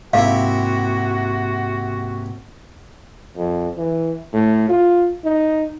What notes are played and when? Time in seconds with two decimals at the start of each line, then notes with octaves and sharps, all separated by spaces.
0.13 G#2 C3 A#3 C4 E4 F#4 F5
3.37 F2
3.77 E3
4.33 A2
4.69 F4
5.24 D#4